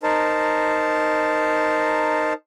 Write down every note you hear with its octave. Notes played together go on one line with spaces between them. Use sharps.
D#4 A#4 C5 A5